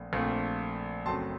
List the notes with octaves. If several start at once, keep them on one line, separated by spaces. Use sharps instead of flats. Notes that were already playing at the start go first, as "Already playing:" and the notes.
Already playing: A#1 A#2 A3 C4
A#1 A#2 A3 C4
F#1 F#2 F#3 A3 C4 A5 C6